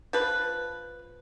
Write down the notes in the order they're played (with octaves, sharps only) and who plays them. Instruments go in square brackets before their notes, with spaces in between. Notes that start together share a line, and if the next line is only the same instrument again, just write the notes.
[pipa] F3 B4